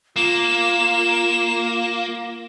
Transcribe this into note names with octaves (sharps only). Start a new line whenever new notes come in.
A#3 F4 E7